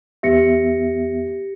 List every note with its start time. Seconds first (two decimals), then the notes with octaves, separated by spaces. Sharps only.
0.23 E2 B3 G4 E5 A#6 C#7